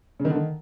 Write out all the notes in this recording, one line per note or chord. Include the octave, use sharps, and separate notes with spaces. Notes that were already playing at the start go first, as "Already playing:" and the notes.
C#3
D#3
D3
D#3